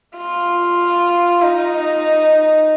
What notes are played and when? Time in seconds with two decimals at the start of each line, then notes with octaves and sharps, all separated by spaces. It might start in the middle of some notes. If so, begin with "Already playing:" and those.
0.17 F4
1.42 D#4